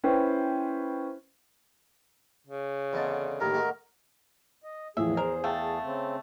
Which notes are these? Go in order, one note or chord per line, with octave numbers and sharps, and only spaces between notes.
C#4 E4 B4 C5 G5
C#3
E2 D3 C4 D#5 A5
D#2 A2 D#3 A3 A#3 A#4
G#3 A3 D#4 F#4
D#5
E2 A2 E3 F3 G#4 E5
A#4 C5
A3 F5 G5 A5
C#3 C4